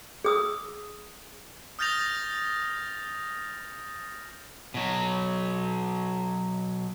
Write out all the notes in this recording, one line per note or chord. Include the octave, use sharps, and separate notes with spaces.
G#4 D#6 E6
D#6 F6 G6 A6 A#6 F7
B2 F#3